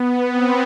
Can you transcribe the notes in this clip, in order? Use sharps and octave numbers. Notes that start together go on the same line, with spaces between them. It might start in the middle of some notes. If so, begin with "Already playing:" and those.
Already playing: B3
C4